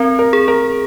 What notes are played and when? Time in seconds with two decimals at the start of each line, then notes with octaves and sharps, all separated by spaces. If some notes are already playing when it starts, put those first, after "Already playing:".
Already playing: C4 A#4
0.19 A#4
0.33 G#4
0.48 A#4